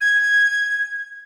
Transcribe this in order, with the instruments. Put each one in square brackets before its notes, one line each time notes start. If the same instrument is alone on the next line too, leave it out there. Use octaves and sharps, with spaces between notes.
[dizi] G#6